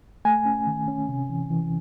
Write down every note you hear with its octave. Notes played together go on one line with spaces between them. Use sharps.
A3 G#5
C#4
D#3
C#4
C3
E3
E3